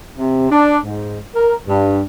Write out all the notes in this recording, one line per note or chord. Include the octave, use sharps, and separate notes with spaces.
C3
D4
G#2
A#4
G2